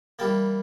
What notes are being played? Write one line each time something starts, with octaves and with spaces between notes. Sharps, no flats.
E3 G3 A#3 G5 A5